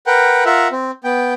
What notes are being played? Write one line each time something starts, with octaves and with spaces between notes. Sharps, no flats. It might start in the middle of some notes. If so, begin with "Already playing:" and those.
A#4 B4 F#5 G5
F4 A#4 E5 F#5
C4
B3 G5